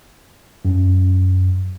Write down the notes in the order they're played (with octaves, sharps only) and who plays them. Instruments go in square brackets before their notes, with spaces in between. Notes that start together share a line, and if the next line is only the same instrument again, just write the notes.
[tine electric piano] F#2